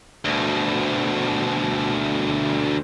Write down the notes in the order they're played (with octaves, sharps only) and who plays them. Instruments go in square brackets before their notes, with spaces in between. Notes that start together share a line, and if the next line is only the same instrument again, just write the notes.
[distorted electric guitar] D2 B2